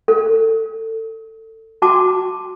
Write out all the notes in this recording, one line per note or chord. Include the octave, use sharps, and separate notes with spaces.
A4
F#4 A5 D6